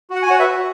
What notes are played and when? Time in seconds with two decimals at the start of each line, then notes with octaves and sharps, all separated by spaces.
0.10 F#4
0.16 F#5
0.22 G#5
0.27 F#4 C#5 F#5
0.39 B4 E5
0.46 F#4